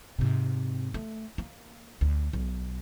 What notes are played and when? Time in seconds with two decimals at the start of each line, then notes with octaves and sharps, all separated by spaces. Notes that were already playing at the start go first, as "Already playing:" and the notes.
0.19 G#2 C3
0.94 A3
1.38 A#3
2.01 D2
2.33 B1